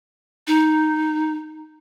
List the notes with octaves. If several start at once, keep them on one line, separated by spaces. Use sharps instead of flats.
D#4